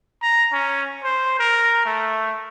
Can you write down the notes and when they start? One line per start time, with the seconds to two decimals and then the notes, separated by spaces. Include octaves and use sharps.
0.22 A#5
0.53 C#4
1.03 C5
1.39 A#4
1.86 A3